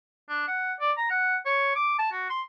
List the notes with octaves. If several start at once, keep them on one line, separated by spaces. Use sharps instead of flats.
D4
F#5
D5
A#5
F#5
C#5
D6
A5
F#4
C6